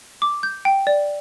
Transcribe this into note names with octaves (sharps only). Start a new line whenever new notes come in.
D6
G6
G5
D5